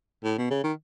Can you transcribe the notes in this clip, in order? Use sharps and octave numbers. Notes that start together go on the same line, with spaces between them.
A2
B2
C#3
D#3